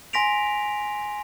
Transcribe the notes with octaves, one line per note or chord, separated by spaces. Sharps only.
G#5 C6 A#6 B6 D7 F7